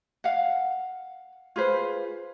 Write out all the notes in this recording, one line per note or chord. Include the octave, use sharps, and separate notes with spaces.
F5 F#5
F4 G#4 B4 C5